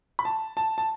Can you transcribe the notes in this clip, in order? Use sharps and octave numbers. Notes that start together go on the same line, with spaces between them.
B5
A5
A5
A5